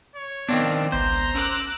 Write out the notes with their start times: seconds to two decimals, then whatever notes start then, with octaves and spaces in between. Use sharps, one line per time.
0.15 C#5
0.49 D#3 B3 C4 D4 D5 F5
0.92 G#1 C#2 B3 C5 A#5
1.35 C#4 D6 E6 F#6